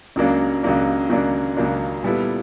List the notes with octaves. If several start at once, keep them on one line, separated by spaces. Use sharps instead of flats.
C#2 C#3 F#3 A#3 D4
C#2 C#3 F#3 A#3 D4
C#2 C#3 F#3 A#3 D4
C#2 C#3 F#3 A#3 D4
A#2 G3 B3 E4 A4